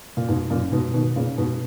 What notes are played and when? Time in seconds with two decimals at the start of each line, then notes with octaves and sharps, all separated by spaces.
0.17 A#2
0.28 G#2 B2
0.50 F#2 A#2
0.72 G#2 B2
0.94 B2 D#3
1.16 A#2 C#3
1.38 G#2 B2